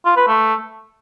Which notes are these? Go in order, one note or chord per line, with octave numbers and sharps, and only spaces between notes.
F4
B4
A3